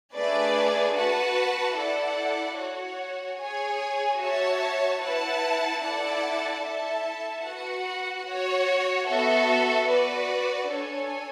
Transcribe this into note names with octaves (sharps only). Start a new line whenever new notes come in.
A3 D4 G#4 B4 D5
F#4 B4 F#5 A5
E4 A4 D5 F#5
F#4 C#5 F#5
G#4 C#5 G#5
F#4 C#5 E5 A5
E4 B4 F#5 A5
E4 A4 D5 F#5 A5
E4 A4 E5 A5
F#4 B4 F#5
F#4 C#5 F#5
B3 F#4 A4 E5
F#4 B4 D5
D4 A4 C#5 G#5